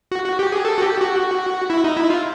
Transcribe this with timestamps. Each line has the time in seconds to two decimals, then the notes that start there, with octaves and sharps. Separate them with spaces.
0.12 F#4
0.25 F#4
0.39 G4
0.52 G#4
0.65 A4
0.78 F#4
0.82 G4
1.01 F#4
1.70 E4
1.84 D#4
1.97 E4
2.10 F4